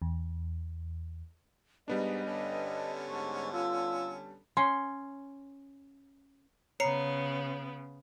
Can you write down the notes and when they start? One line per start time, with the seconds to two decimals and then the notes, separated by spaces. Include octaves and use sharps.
0.02 E2
1.88 G#2 G3 B3 D4 D#5
2.26 G2 D3 C#4 A4
3.09 G#2 C#6
3.53 F4 E6
4.57 C#4 C6
6.80 C#3 B3 C#5 A#5 C7 C#7